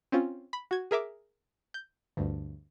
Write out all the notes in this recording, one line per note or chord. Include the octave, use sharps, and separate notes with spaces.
C4 C#4 F4
B5
F#4 G#6
G#4 A#4 E5 D6
G6
D2 G2